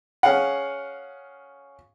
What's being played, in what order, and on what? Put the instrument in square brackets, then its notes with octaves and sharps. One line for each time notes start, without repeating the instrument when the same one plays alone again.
[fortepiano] C#4 G#4 F5 F#5